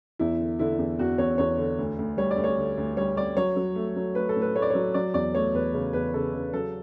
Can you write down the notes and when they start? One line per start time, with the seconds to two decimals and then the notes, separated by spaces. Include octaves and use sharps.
0.19 E2 E4
0.40 D3
0.59 D3 E4
0.79 E2
0.99 E2 F#4
1.18 E2 C#5
1.38 E2 C#5
1.58 D3
1.79 D2
1.99 D2
2.17 G3 C#5
2.31 D5
2.38 D2
2.44 C#5
2.58 D3
2.77 D2
2.97 G3 C#5
3.16 G3 D5
3.37 F#3 C#5
3.57 F#3
3.76 A3
3.96 F#3
4.15 A3 B4
4.29 A4
4.36 A2
4.42 B4
4.56 A3 C#5
4.62 D5
4.70 F#3 C#5
4.94 F#3 D5
5.14 E2 D5
5.35 A3 C#5
5.54 E2 B4
5.74 C#3
5.93 E2 B4
6.14 C#3 A4
6.34 C#3
6.53 F#3 A4